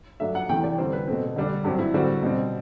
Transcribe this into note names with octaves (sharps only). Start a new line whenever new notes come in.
G2 F#3 A3 D4 E5
F#5
E2 C3 E3 A3 G5
D5
D3 G3 C4 C5
B4
B2 A3 C4
D3 G3 D4
G2 F#3 C4 G4
E4
D3 G3 C4 F#4
B2 G3 C4